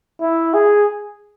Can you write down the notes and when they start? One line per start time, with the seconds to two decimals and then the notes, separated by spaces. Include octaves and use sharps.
0.20 E4
0.54 G#4